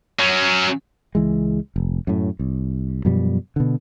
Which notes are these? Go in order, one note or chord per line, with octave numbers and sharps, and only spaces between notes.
F#3 C#4
C#2 E3 G#3
F1
F#2 A2
C2
F#2 B2 F3 G3
B2 D3